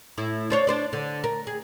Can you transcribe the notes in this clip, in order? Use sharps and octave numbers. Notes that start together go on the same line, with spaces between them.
A2 E4
D4 C5 C#5
D4 C5 D5
D3
A#4
G#4